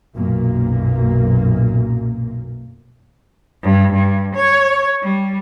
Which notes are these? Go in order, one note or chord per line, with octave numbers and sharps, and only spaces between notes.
B1 F#2 A#2 A#3
G2
G2
C#5
G3